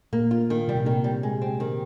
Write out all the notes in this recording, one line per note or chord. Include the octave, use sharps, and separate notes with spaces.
A#2 A#3
F4
D#3
C3 G3
A#2
C3 D#3
G3
G#3
C4
D#3